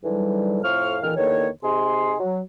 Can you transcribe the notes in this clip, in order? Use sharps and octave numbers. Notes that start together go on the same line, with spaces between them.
G#2 D3 E3 F#3 G3
F2 A2 C5 F5 C#6 F6
C#2 A#2 D#3 E3 A4 F6
E2 D3 D#3 A#3 B4 C#5
C3 D#4 G#4 C6
F#3